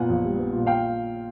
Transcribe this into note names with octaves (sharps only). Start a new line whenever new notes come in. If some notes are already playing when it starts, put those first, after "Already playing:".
Already playing: A#2 B3 F#5 G#5
A#1
G3
B3
A#2
F5 G5